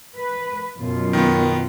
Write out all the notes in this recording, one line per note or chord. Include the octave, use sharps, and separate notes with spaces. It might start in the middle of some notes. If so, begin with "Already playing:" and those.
B4
F#2 B2 F4
D#3 B3